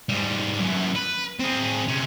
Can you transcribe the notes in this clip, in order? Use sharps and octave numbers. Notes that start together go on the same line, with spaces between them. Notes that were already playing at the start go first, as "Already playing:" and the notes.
G#2 G3
F#2 E3
B4
C4 G#4
C3 C#4